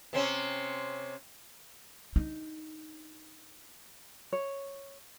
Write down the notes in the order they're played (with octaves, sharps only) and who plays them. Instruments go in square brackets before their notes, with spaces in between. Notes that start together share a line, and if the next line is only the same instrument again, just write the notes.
[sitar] C3 C4 C#4
[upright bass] D4 D#4
[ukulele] C#5